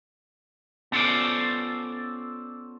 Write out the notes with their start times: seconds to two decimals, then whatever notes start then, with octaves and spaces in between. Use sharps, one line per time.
0.92 B3 C#4 F4 A4 C5 D5